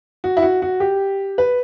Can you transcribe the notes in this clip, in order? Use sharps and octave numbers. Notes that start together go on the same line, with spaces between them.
F#4
E4
F#4
F#4
G4
B4